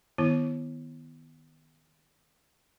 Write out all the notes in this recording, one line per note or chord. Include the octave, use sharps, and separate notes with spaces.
D#3 B3 E4